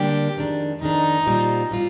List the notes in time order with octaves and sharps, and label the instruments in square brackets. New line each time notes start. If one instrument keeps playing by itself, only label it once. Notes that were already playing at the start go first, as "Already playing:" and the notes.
Already playing: [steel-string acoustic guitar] D3 G3 A#3 D4 [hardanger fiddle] G4
[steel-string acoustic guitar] F2 D#3 G#3 D4
[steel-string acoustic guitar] F2 D#3 G#3 D4 [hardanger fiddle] D#4
[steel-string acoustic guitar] A#2 G3 C4 F4
A#2 G3 C4 F4